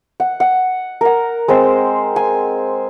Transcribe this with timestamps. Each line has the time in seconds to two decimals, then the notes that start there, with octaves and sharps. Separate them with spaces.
0.20 F#5
0.40 F#5
1.01 A#4 F#5
1.48 G#3 C4 C5
2.16 G#5